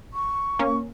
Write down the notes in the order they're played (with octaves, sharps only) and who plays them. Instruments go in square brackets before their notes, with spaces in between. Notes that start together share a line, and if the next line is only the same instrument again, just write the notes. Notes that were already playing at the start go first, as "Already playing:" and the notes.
[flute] C#6
[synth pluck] A#3 C#4